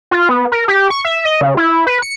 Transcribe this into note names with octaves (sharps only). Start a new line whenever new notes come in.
F4
B3
A#4
G4
C#6
E5
D#5
C#3
E4
B4
C#7